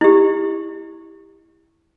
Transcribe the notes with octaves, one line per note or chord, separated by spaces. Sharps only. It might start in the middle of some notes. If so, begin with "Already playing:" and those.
E4 G4